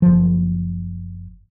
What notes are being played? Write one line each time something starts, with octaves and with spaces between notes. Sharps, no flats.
F#1 F3